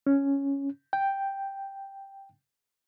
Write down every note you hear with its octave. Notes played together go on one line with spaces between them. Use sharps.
C#4
G5